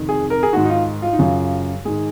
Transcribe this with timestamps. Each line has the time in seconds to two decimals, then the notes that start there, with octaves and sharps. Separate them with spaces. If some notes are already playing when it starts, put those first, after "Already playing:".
Already playing: F2 C3 D#3
0.09 G#4
0.30 A#4
0.43 G#4
0.53 G#2 D#3 F#4
0.65 D#4
0.70 F4
1.02 F4
1.13 D#4
1.19 F#2 C#3 F4
1.85 G#2 D#3 G#4